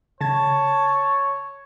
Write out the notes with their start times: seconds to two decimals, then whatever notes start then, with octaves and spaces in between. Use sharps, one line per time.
0.21 C#3 C#5 A5 G#6